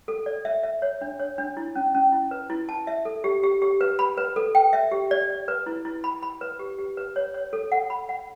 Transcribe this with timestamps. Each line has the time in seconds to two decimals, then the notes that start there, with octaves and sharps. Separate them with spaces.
0.08 A4
0.26 D5
0.45 E5
0.63 E5
0.82 C#5
1.01 D4
1.19 C#5
1.38 D4
1.57 E4
1.75 C#4
1.94 C#4
2.12 E4
2.31 B4
2.50 E4
2.69 A5
2.87 E5
3.05 A4
3.24 G4
3.43 G4
3.62 G4
3.81 B4
3.99 B5
4.17 B4
4.36 A4
4.55 G5
4.73 E5
4.92 G4
5.11 D5
5.30 D5
5.48 B4
5.66 E4
5.85 E4
6.04 B5
6.23 B5
6.41 B4
6.59 G4
6.79 G4
6.97 B4
7.16 C#5
7.34 C#5
7.53 A4
7.72 F#5
7.90 B5
8.09 F#5